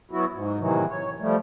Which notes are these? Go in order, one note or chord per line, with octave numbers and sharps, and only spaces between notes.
F#3 B3 E4 F#4
G#2
A2 C3 D#3 E3 F#3
C#5
F3 G3 A3